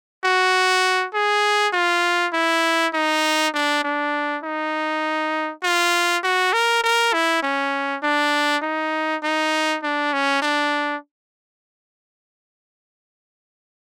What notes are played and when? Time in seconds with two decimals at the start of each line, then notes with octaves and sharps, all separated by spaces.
0.25 F#4
1.14 G#4
1.73 F4
2.33 E4
2.94 D#4
3.54 D4
3.84 D4
4.43 D#4
5.63 F4
6.23 F#4
6.53 A#4
6.83 A#4
7.13 E4
7.43 C#4
8.03 D4
8.62 D#4
9.23 D#4
9.83 D4
10.13 C#4
10.42 D4